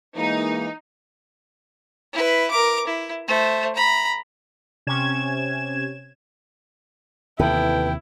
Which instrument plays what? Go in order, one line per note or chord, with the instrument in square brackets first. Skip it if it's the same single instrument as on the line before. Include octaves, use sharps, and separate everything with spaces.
[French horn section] E3 G#3 A#3 [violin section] D#4
[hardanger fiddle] E4 B4
A#4 D6
E4
A3 C5
A#5 B5
[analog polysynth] C3 C#4 G#6 E7
[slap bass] D#2 C3 E3 [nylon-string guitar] B3 A4 B4 [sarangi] E4 [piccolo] G5